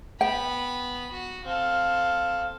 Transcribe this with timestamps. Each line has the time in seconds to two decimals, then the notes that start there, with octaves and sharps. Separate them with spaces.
0.21 B3 G5 B5
1.11 F#4
1.45 C4 A4 F5